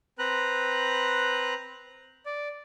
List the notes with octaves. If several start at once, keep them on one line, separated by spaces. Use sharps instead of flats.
C4 B4 A#5 F#6
D5